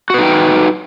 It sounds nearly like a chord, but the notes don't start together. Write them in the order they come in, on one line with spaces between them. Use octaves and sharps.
F#4 B4 D#4 G5